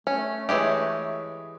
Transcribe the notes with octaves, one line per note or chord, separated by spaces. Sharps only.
A3 C#4
E3 G#3 G4 C#5 E5